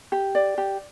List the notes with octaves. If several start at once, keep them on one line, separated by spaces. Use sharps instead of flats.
G4
D5
G4